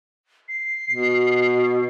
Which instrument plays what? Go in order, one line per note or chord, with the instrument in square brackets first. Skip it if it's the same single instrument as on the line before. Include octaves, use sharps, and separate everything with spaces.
[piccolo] C7
[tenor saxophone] B2